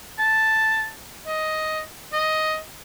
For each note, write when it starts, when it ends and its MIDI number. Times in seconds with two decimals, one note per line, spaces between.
0.18 0.89 81
1.27 1.80 75
2.13 2.56 75